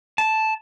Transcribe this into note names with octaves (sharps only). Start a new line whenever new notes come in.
A5